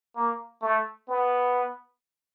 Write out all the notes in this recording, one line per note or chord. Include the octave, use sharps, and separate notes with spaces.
A#3
A3
B3